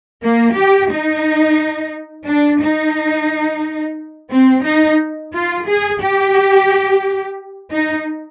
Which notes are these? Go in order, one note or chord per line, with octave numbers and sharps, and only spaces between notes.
A#3
G4
D#4
D4
D#4
C4
D#4
F4
G#4
G4
D#4